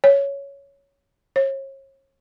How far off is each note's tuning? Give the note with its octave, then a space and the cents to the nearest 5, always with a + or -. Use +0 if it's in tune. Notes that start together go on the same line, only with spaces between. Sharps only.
C#5 +10
C#5 -40